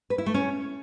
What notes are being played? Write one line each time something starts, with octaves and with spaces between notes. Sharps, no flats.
B4
E4
A3
C#4